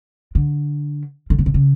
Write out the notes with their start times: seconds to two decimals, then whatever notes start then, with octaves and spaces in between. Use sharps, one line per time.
0.35 D3
1.30 D3
1.39 C#3
1.46 C3
1.54 C#3